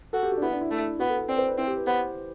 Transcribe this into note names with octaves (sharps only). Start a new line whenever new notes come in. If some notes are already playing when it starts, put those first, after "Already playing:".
F#4 A4
G4
F#4
D4
B3 E4
D4
E4
A3
B3 F#4
A4
B4
C4 D5
C5
B4
C4 E4
G4
B4
B3 C5